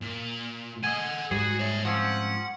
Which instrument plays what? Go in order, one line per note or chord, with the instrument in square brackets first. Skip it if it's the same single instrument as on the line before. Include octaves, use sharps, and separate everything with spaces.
[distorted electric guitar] A#2
[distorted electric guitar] A4 F#5 [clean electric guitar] D#5 G#5
[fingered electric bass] G#2 G3 [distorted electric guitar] F#4 [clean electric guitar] G#4
[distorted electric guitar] C#5 E5
[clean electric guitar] F3 C4 C#4 [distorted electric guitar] F#5